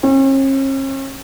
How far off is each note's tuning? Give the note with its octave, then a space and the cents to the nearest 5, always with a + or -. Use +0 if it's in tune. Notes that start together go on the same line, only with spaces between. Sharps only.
C#4 -45